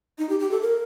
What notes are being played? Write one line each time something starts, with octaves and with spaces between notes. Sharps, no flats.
D#4
G4
G4
A4
A#4